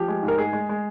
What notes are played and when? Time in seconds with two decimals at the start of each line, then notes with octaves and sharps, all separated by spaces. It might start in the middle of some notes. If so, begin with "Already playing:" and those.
Already playing: F3 G4
0.08 G#3
0.23 G#2
0.28 A#4
0.38 G#3 G#4
0.53 G#3
0.69 G#3